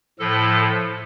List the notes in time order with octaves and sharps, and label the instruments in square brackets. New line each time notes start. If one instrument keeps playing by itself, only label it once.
[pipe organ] A2 F3 A4